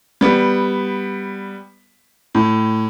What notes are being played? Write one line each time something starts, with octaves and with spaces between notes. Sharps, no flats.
G3 B3
A2